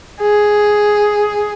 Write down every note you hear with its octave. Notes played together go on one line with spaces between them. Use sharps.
G#4